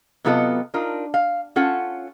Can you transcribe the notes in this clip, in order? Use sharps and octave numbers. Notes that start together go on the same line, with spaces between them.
C3 F#3 B3 F4 A4 D#5
D4 D#4 F4 A#4
F5
C#4 F4 A4 F#5